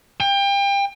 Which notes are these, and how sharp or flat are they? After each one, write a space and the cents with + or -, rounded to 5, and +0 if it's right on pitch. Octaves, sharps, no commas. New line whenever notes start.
G5 +30